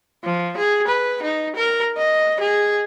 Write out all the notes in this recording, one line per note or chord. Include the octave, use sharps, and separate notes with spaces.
F3
G#4
B4
D#4
A#4
D#5
G#4